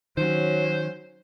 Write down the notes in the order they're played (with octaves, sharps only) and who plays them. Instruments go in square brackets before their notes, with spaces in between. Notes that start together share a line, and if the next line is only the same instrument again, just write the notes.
[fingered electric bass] D#3 [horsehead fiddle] F#3 C#4 [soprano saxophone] C5